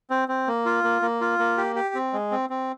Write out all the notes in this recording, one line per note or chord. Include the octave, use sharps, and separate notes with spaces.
C4
C4
A#3
F4
A#3
A#3
F4
A#3
G4
G4
C4
G#3
C4
C4